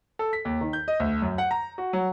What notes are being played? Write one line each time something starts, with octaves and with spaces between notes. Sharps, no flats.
A4
B6
D#2
D#3
G6
D#5
D2
F#2
F#5
A#5
F#4
F#3